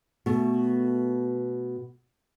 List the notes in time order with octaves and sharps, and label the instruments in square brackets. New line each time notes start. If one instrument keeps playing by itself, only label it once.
[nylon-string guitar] B2 A3